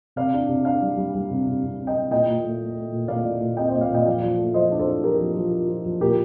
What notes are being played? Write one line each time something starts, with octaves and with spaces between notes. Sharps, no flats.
C3 D5 F5
D4
C3
D4 D5 F5
G3
G3
G3
C3
C3
C3
C3
D#5 G5
C3
A#2 D#5 G5
A#2
A3
A3
A3
A#2
A#2 D5 F5
A3
A#2
C4 D#5 G5
A#2 C5 D#5
D5 F5
A#2 D#5 G5
F3 D5 F5
F3
A3
F3 C5 D#5
D4
A4 C5
D4
F3 G4 A#4
F3
F3
F3
F3
F3
A#2 G4 A#4